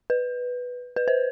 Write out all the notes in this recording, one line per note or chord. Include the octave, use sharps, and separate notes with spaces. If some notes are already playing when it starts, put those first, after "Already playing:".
B4
B4
C5